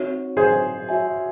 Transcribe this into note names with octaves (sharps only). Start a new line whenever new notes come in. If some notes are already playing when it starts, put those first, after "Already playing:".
Already playing: C4 D#4 F#4 C#5
G#4 C5
F#4 C#5 E5 G#5